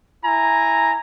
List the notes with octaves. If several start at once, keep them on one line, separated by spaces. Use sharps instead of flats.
E4 G#5 A#5